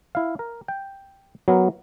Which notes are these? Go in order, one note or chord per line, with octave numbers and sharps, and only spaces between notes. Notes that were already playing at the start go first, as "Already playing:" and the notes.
E4 F5
A#4
G5
F#3 B3 A#4